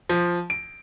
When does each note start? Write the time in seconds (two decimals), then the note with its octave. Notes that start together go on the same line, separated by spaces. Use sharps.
0.09 F3
0.50 D7